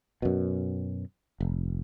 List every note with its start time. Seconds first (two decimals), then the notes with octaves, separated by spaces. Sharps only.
0.22 F#2 B2
1.40 F1